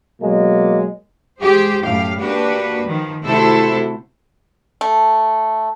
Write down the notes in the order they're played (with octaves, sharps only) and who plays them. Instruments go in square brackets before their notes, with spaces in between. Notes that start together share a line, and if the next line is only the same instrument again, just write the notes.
[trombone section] B2 F#3 G#3 A#3
[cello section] G#3 G4 G#4 C5
F#2 A2 G4 F5
A#3 D4 F#4 G4 B4
D#3 F3
C3 A3 E4 F#4 A4 C5
[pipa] A3